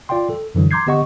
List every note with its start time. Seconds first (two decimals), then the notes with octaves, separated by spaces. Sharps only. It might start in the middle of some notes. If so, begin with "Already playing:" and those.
0.09 F4 D5 F5 G5 C6
0.30 A4
0.55 F#2 D3 E3 F#3
0.71 A#5 C6 D6 G6 G#6 C7
0.86 D3 B3 G4 D#5 F#5 C#6